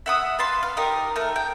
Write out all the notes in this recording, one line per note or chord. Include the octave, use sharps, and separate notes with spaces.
E5 F#5 D#6
B4 F5 A5 C6
F5
D#4 G4 A#4
A3 A#4
G5